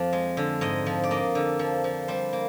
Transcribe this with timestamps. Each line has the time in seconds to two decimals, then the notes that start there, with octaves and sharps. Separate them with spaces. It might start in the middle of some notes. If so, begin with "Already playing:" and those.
Already playing: F2 F3 C5 D5
0.13 G#3
0.37 D3
0.61 G#2 D#5
0.86 F3
1.03 D5
1.11 A#3 D#5
1.35 D3
1.59 F3
1.84 F3
2.08 G3 C5
2.33 A#3